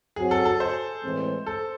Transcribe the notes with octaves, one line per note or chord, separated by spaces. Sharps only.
F#3 C4 F#4 G#4
A4
A4
C5
A2 E3 G#3 C4
A4